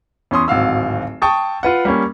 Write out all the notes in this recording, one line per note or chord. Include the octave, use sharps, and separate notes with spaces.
E2 C#4 C6 D#6
D1 G#1 F#4 F5 E6
G5 A5 C#6 D#6 A6
F4 B4 F#5
G3 A#3 C#4